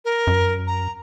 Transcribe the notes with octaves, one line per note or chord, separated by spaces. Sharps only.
A#4
F#2
A#5